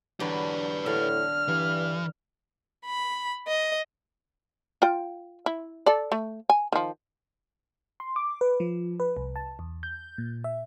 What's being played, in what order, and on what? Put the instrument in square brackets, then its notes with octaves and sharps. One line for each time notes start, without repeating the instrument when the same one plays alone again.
[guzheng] E2 D3 F#3 [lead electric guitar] G4 B4
[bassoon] A2 [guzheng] D3 [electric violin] F6
[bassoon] G2 [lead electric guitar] E3
[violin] B5
D#5
[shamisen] F4 G5
E4
A4 D5
A3
G#5
D#3 F3
[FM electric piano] C6
D6
B4
F3
B4
C2
A5
E2
G6
A#2
E5